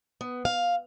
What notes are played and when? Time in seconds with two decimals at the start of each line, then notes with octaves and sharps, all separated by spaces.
0.21 B3
0.45 F5